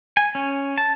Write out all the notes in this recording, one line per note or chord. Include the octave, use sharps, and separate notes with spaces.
G#5
C#4
A5